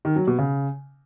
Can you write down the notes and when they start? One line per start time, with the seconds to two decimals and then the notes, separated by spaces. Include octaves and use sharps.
0.05 D#3
0.16 F#3
0.27 B2
0.38 C#3